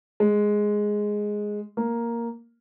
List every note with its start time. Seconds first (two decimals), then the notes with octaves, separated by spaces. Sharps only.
0.20 G#3
1.77 A#3